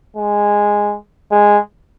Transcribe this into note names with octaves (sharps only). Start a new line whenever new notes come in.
G#3
G#3